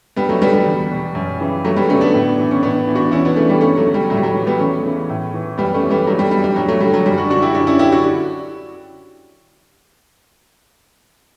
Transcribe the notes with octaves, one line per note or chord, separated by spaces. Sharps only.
G2 G3 B3
F#3 A3
D3 G3 B3
G3
E2
B2
F#2
C#3 E3
G2 F#3 A3
G3 B3
D3 A3 C#4
B3 D4
A2
E3
C#4
A2 B3 D4
E3
D4 F#4
E2 C#4 E4
B3 D4
C#3 E3 A3 C#4
G3
G2 A3 C#4
F#3 A3
D3
G3
A2 F#3 A3
G3
F#3
E3
G3 B3
E2 A3 C#4
C#3 E3
A2
E3
F#2 G3 B3
A3 C#4
E3
G3 B3
G2 F#3 A3
G3
E3 G3
G3
G2 F#3
F#3 A3
D3 G3
F#3
F#2 G3
D4 F#4
D3 D4 F#4
E4 G4
F#2 D4 F#4
C#4 E4
D3 E4 G4
D4 F#4